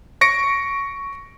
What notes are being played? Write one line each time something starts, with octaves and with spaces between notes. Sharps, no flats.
C#6 A#6 C#7 D7